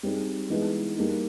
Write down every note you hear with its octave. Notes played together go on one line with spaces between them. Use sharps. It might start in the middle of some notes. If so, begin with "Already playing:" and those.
G3 C4 D#4 G#4
E3 G#3 B3 D#4 G#4
G3 A#3 D#4 G#4